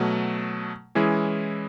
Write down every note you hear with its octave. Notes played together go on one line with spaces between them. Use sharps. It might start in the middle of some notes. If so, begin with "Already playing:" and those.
Already playing: B2 F#3 A3
E3 G#3 C#4 E4 G#4